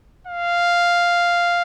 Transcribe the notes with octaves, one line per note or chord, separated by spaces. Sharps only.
F5